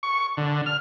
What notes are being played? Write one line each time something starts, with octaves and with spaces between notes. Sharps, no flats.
C#6
D3
F6